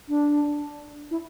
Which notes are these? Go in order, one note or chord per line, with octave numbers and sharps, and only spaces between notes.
D4
E4